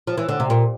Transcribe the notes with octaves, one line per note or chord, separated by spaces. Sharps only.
F3
E3
D3
C3
A#2